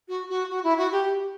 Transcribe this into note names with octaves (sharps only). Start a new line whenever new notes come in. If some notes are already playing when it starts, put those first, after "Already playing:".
F#4
F#4
F#4
E4
F#4
G4